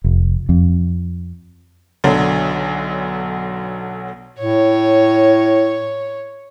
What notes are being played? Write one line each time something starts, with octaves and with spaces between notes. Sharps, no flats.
F1
F2
B1 D3 F#3
A2 C#5